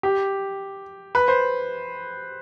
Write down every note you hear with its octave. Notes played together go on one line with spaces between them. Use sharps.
G4
B4
C5